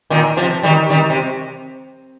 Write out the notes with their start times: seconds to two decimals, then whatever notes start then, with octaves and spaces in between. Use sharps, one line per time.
0.10 A#2 D#3
0.37 C3 F3
0.63 D#3 G3
0.90 D#3 G3
1.10 C3